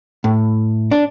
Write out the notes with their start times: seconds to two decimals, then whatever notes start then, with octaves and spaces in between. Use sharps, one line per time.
0.24 A2
0.91 D4